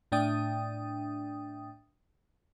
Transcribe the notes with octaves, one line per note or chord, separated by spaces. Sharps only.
A2 D4 G5 D#6